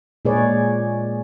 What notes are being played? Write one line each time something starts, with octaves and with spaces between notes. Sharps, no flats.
A#2 G#3 G#4 B4 C#5 D5